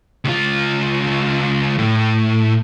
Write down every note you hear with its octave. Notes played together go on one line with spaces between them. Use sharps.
C#2 F4
A2